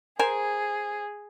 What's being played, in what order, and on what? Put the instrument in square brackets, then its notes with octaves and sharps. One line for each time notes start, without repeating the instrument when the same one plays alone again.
[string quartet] G#4 [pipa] A#4 C5 G#5